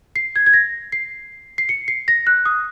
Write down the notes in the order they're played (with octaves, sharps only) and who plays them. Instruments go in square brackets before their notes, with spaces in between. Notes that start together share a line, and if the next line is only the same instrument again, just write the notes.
[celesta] C7
G#6
G#6
A#6
C7
C7
C#7
C7
A#6
F#6
D#6